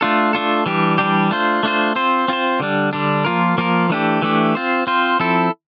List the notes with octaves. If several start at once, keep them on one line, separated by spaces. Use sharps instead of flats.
A3 D4 F4 A4
A3 D4 F4 A4
E3 G3 D4 G4
E3 G3 D4 G4
A3 D4 F4 C5
A3 D4 F4 C5
C4 F4 C5
C4 F4 C5
D3 G3 D4
D3 G3 D4
F3 A#3 F4 A#4
F3 A#3 F4 A#4
E3 A3 D4 G4
E3 A3 D4 G4
C4 F4 C5
C4 F4 C5
F3 C4 E4 A4